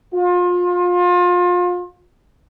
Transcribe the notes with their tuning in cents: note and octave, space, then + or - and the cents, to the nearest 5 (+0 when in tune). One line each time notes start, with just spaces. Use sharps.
F4 +30